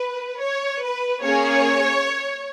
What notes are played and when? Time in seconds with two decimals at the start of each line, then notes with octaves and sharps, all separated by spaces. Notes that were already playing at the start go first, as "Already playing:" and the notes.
Already playing: B4
0.41 C#5
0.82 B4
1.23 A#3 C#4 G#4 C#5